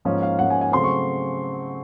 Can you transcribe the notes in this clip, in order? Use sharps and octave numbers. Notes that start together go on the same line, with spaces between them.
G#2 F3 A#3 C#4
F5
G#2 F3 A#3 C#4 F#5
G#5
G#5
C#3 F#3 A3 C4 C6
C#6